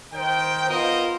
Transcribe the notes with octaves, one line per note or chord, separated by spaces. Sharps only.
D#3 C5 G5
B3 F4 A#4 C5 D#5